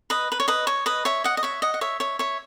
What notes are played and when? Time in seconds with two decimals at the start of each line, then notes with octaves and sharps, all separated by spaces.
0.10 B4 D#5
0.32 B4
0.40 C#5
0.48 B4 D#5
0.67 C#5
0.86 B4 D#5
1.05 C#5 E5
1.24 D#5 F#5
1.37 D#5
1.43 C#5 E5
1.62 D#5 F#5
1.74 F#5
1.81 C#5 E5
2.00 C#5 E5
2.19 C#5 E5